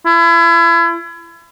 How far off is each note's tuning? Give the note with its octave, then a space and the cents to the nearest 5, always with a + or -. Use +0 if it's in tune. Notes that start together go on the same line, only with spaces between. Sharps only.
E4 +35